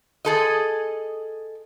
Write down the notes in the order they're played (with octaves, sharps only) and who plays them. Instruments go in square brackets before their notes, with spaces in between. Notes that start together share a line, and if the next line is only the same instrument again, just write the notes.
[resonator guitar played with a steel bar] G#4 A4 D#5